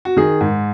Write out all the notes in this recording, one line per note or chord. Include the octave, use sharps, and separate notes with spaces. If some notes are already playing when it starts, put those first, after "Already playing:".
F#4
D#3 G#4
G#2